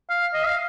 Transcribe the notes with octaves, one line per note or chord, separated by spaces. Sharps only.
F5
D#5
F5